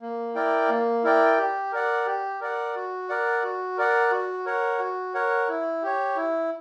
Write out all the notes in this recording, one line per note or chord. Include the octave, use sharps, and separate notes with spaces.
A#3
E4 A#4 D5 G5
A#3
E4 A#4 D5 G5
G4
A#4 D5 F#5
G4
A#4 D5 F#5
F#4
A#4 D5 F#5
F#4
A#4 D5 F#5
F#4
A#4 C#5 F#5
F#4
A#4 C#5 F#5
E4
G4 C#5
E4